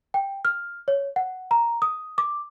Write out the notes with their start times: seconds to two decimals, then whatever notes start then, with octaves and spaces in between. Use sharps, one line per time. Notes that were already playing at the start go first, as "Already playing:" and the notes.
0.14 G5
0.45 F6
0.88 C#5
1.16 F#5
1.51 A#5
1.82 D#6
2.18 D6